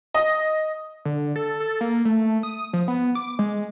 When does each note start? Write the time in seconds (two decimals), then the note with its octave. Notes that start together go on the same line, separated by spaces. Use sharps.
0.14 D#5
1.05 D3
1.36 A4
1.60 A4
1.81 A#3
2.05 A3
2.43 D#6
2.73 F3
2.88 B3
3.15 D6
3.39 G#3